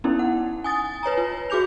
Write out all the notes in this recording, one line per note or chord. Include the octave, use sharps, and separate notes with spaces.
B3 C#4 D#4 E4
F#5
G#5 D#6 A6
B4 C#5 G#5 A#5
F4
F#4 G#4 D6 G6 F7